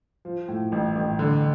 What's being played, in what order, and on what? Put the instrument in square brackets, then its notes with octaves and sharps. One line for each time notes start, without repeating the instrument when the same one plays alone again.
[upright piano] F3
A2
A1
A1
D3